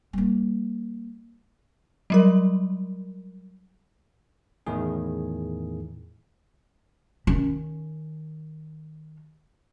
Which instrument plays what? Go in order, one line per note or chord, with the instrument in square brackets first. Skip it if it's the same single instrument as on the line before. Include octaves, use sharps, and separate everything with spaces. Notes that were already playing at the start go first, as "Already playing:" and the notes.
[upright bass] G3 A#3
[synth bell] F#3 G3 A#4
[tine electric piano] E2 A2 D#3 G#4
[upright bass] D#3 C#4